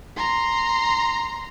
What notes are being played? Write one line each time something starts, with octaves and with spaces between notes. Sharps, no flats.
A#5 C6